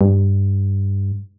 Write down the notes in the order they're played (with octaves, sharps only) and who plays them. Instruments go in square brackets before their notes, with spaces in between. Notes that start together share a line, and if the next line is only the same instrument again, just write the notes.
[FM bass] G2